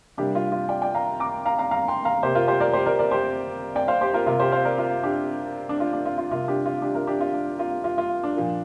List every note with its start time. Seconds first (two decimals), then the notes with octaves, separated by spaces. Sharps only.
0.17 C3 G3 A#3 D4 G4
0.35 F4
0.52 F4
0.69 D5 G5
0.82 D5 G5
0.95 F5 A#5
1.20 A#5 D6
1.45 F5 A#5
1.58 F5 A#5
1.71 F5 A#5
1.88 G5 C6
2.05 F5 A#5
2.23 C3 A#3 G4 C5
2.35 F4 A#4
2.48 G4 C5
2.60 A#4 D5
2.73 G4 C5
2.86 A#4 D5
2.99 A#4 D5
3.11 G4 C5
3.75 D5 G5
3.88 C5 F5
4.01 G4 C5
4.14 F4 A#4
4.26 C3 A#3 F4 A#4
4.40 G4 C5
4.52 C5 F5
4.65 A#4 D5
4.78 F4 A#4
5.03 D4 G4
5.69 D4
5.80 F4
5.93 D4
6.05 F4
6.18 F4
6.31 C3 A#3 F4
6.48 D4 G4
6.66 F4
6.82 D4 G4
6.95 F4 A#4
7.07 D4 G4
7.21 F4
7.34 D4
7.59 F4
7.84 F4
7.98 F4
8.23 D4
8.35 A#2 F3 A#3